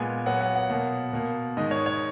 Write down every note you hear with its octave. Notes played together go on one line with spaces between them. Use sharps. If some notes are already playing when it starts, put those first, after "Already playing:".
Already playing: A#2 G#3 B3 G#5
A#2 F#3 B3 F#5
F#5
F#5
B2 A#3
B2 A#3
G#2 D#3 G#3 D#5
C#5
C#5